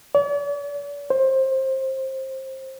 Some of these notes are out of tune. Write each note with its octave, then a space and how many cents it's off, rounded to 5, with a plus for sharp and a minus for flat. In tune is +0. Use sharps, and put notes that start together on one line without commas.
D5 -45
C5 +20